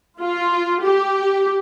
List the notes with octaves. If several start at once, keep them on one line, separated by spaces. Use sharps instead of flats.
F4
G4